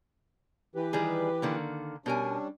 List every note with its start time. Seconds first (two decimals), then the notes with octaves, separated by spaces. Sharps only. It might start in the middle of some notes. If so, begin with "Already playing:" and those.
0.75 E3 G4 B4
0.93 D#3 G3 G#4
1.42 D3 D#3 A#3
2.06 B2 G3 C#4 D4 A#4 G#5